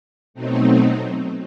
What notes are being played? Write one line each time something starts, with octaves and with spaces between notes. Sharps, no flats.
B2 F#3 A3 C4 D#4